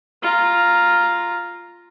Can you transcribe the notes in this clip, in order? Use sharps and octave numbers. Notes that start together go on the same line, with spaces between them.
F4 A#5